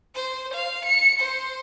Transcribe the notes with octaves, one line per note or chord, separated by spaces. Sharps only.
C5
F5
C#7
C5